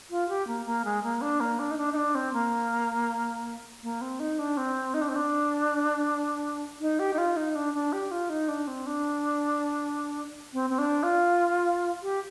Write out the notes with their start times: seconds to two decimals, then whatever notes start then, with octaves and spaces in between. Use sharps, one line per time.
0.10 F4
0.29 G4
0.48 A#3
0.66 A#3
0.85 G#3
1.03 A#3
1.21 D4
1.40 A#3
1.59 D4
1.71 D#4
1.78 D4
1.92 D#4
1.96 D4
2.15 C4
2.34 A#3
3.83 A#3
4.01 C4
4.20 D#4
4.39 D4
4.57 C4
4.94 D#4
5.01 D4
5.09 C4
5.16 D4
6.81 D#4
6.99 G4
7.13 D#4
7.18 F4
7.37 D#4
7.55 D4
7.74 D4
7.93 G4
8.11 F4
8.29 D#4
8.48 D4
8.67 C4
8.86 D4
10.53 C4
10.70 C4
10.79 D4
11.03 F4
12.03 G4